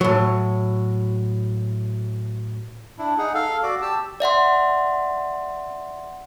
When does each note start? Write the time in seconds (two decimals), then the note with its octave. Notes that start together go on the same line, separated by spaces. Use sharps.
0.01 A2 F#3
2.98 D4 E4
3.18 D#4 G#4 F#5
3.34 A4 F5
3.63 F#4 D5 D6
3.82 G4 A5 E6
4.20 D5 E5 F#5 C6